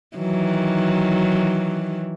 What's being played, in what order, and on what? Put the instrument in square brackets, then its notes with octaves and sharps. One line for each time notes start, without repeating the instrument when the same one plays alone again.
[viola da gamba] D#3 E3 F#3